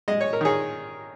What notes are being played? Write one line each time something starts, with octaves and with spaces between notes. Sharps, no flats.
G#3 D#5
C#5
A#4
D#3 G#4 C#5